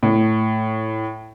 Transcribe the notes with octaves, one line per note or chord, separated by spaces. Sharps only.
A2